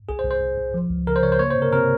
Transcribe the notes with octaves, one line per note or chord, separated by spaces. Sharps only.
C2 G#4
C5
C2
C5
C2
C2
F3
C#2
C#3 A#4
C5
C#3 C#5
C5
A#3 C#5
C5
C3
A#4
C3 A#4